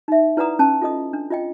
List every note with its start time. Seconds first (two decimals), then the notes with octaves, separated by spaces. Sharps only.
0.08 D#4 E5
0.37 E4 B4 D5 F#5 A#5 D#6
0.59 C#4 A5
0.82 F4 A4 D#5 D#6
1.13 D4
1.30 F4 D#5 G5